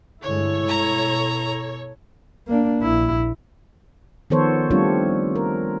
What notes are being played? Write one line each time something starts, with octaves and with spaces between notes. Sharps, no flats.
G2 D3 G#3 E4 A4 C#5
B2 A#5
A#3 D4
A#1 E4
D#3 F3 B3 A4 C5 C#5
G3 A3 C4 D4 F4 C#5
A#4